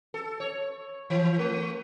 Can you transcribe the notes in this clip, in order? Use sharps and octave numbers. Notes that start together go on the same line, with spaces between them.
A4
C#5
E3
A3